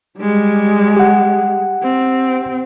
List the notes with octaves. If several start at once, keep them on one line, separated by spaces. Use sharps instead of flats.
G3 G#3
G4 F#5
C4